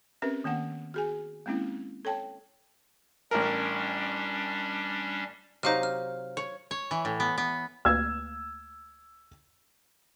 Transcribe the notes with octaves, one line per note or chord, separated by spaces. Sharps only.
C4 C#4 G4 A#4 B4 E5
D#3 A#3 B3 F#5
F#4 G#4 G#5
G#3 A#3 C4 C#4 E4
A4 C#5 G5 A5
A1 G3 C#4 D4 A#4
C3 F#3 D#4 C5 F5 F6
F6
C#5
C#5
E3
A2
B3
B3
D2 A#3 E6 F6 G#6